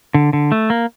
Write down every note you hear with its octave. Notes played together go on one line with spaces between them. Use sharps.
D3
D3
A3
A#3